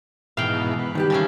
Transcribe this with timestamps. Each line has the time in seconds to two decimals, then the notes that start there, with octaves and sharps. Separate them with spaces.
0.37 G#2 B2 E3 F5 G5
0.79 B4
0.95 D#3 G3 G4
1.10 C#3 E3 C#4 A5